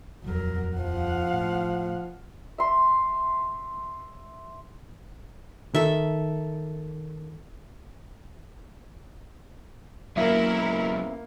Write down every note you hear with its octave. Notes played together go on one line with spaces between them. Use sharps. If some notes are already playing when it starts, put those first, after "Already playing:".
D#1 F2 F#3 A#4
F3 F5 F#5
A2
E5 C6
D#3 A4 E5
B2 F#3 G#3 A#3 C#4 E4 A#4 E5